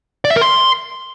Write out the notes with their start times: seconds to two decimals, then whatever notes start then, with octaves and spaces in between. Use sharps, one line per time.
0.25 D5
0.30 E5
0.36 A#4
0.41 C6